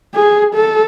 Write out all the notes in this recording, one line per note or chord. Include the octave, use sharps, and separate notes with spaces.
G#4
A4